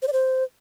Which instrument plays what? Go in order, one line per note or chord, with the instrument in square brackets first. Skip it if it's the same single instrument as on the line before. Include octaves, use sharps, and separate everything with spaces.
[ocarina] C5
D5
C5